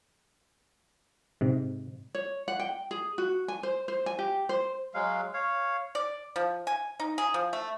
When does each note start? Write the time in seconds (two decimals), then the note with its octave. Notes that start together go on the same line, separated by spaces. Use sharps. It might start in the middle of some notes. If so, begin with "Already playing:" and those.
1.41 G#2 C3
2.15 C#5
2.48 F#5
2.60 G5
2.91 G#4
3.18 F#4
3.48 G#5
3.63 C5
3.88 C5
4.06 G#5
4.19 G4
4.49 C5
4.94 F#3 G#3 F5
5.34 C#5 F5
5.95 D5
6.36 F3
6.67 G#5
7.00 D#4
7.18 G#4
7.34 F3
7.53 A3